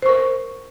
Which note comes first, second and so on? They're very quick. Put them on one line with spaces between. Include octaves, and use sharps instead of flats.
C5 C#6 A#4